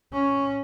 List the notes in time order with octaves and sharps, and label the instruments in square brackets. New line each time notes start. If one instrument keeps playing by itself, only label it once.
[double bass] C#4